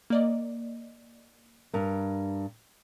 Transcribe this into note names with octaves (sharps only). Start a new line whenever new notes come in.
A#3 D5 D#5
G2 A#4